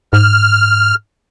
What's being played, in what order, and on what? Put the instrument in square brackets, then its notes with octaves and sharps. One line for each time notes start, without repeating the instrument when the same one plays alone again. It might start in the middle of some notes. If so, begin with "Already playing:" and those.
[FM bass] G#2 [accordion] F6